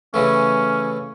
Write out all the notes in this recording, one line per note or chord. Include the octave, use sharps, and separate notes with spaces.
C#3 E3 A3 C#4